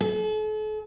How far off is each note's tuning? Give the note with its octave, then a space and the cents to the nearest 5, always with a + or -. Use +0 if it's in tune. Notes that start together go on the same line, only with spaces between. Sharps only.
A4 -45